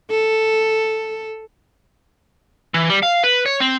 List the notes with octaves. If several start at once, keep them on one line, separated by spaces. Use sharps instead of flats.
A4
E3
G3
F5
B4
C#5
C4